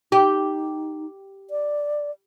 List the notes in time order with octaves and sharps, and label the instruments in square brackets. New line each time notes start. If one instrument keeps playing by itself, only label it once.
[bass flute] D#4 [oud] G4
[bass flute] D5